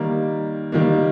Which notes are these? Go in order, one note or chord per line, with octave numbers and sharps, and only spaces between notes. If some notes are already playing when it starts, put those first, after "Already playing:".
Already playing: D#3 G3 A#3
D#3 G3 A#3